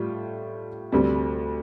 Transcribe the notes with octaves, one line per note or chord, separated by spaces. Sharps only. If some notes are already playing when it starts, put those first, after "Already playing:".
Already playing: A2 G3 F4
D2 C3 G3 C4